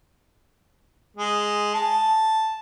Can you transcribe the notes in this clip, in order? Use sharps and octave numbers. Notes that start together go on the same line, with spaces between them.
G#3
A5